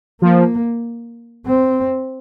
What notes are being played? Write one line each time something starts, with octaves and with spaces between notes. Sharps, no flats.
F3 A#3
C4